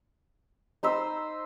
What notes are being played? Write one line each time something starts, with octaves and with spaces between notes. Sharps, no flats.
D#4 C5 B5 E6